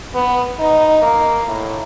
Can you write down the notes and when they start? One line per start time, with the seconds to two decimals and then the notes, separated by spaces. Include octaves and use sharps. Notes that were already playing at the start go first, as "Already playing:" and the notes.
0.14 B3
0.59 D#4
1.02 A#3
1.47 A2